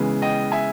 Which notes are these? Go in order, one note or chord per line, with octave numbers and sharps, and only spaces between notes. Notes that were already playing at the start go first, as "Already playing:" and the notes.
Already playing: C#3 E3 G#3 B3
D#5 G5
E5 G#5